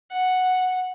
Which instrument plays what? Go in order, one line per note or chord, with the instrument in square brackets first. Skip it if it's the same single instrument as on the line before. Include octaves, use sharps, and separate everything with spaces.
[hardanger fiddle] F#5